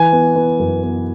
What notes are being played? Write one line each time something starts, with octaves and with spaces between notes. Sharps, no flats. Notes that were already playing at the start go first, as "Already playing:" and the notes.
Already playing: E3 G#5
B3
B3
F#2
B3